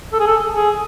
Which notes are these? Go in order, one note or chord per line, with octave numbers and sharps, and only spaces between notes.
A4
G#4
A4
G#4